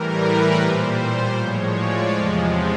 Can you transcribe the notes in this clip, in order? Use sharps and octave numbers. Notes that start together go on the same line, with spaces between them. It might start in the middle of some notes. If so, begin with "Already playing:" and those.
Already playing: A2 E3 G3 A#4
B4
A#2 G3 C5
A2 F3 G#3 C#5
D5
E2 C3 F3 G#3